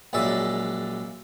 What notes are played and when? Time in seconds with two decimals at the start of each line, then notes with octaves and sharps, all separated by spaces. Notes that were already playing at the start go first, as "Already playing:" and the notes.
0.13 A#1 F#2 G#3 D5 E5